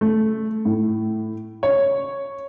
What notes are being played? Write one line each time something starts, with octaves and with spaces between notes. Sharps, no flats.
A3
A2
C#5